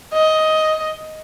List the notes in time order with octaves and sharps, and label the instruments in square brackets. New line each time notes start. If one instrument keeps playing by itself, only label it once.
[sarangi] D#5